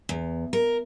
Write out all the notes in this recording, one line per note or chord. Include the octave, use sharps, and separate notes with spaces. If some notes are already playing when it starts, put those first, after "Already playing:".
E2
A#4